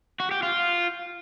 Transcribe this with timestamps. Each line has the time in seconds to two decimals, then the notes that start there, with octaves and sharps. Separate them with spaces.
0.20 F#4
0.31 G4
0.43 F4